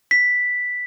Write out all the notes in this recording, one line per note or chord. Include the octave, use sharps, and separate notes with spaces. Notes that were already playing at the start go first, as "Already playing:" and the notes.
B6